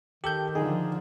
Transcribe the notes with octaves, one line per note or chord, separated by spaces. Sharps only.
D#3 G4 A4 G6
D3 F3 D#4 G#4